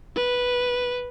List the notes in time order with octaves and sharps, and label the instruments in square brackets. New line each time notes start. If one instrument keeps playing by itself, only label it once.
[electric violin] B4